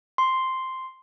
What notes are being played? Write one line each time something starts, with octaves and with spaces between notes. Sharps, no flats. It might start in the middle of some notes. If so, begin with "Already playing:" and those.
C6